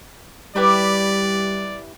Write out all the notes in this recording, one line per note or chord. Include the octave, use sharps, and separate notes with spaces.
G3 E4 G4 B4 D5